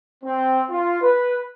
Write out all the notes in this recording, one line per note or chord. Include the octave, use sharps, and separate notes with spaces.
C4
F4
B4